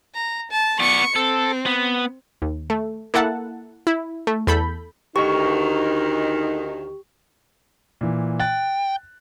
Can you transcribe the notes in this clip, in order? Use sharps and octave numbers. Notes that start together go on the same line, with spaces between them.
A#5
A5
B3 D5 C#6 C#7
C4 A4
B3
D#2
A3
A#3 E4 A4 F#5 A5
E4
A3
E2 A4 B5 G6
D2 D#3 D#4 G4 C#6
A#2 E3
G5 F#6 A6